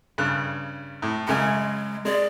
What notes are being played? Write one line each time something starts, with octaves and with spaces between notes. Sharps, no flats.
G2 C#3 F#6
A2
F#2 C#3 G#3 G#5
G#3 D5